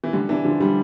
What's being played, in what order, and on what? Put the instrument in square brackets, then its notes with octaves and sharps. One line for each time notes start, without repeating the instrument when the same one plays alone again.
[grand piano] E3
[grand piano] D3 [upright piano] G3
[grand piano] E3 [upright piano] D4
[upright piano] D3 [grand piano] F3
[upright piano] D3 [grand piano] G3